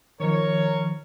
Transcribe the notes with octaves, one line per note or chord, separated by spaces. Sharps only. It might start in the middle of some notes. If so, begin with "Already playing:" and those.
D#3 F3 A#4 C#5